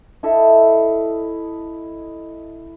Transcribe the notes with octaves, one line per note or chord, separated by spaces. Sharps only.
E4 A4 D#5 E5